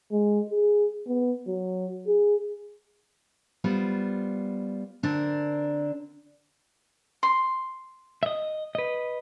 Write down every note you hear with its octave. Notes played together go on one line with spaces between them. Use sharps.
G#3
G#4
B3
F#3
G#4
G3 B3 F4 C5
D3 C4 D4 A#4
C6
D#5 E5
B4 D#5